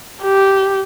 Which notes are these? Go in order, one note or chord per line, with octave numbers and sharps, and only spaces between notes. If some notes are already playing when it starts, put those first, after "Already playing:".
G4